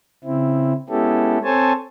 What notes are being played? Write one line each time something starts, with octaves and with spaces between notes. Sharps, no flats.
C#3 C4 E4
G#3 B3 C#4 E4 G4 A4
C4 A4 C5 C#5 G#5 A5